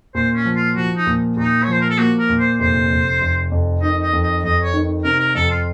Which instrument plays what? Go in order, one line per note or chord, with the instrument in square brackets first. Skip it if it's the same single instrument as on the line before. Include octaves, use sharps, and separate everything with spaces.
[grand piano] A#2 [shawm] C5
[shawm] C#4
[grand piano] F3
[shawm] F4
[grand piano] F3 [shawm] F#4
[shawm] D#4
[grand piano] A#2
[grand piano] A#2 [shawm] D#4
[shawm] C#5
[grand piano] F3 [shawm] C5
[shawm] A#4
A4
[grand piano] A#3 [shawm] F#4
[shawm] A#4
[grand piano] A#2
[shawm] C5
[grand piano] F1 [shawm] C5
[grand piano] F1
F1
F2
[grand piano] D#3 [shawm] D#5
[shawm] D#5
[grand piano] F2
[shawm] D#5
[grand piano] F2 [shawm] D#5
[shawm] C#5
[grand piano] D#3
[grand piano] C3 [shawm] A#4
[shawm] A#4
[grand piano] F2 [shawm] A4
[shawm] F4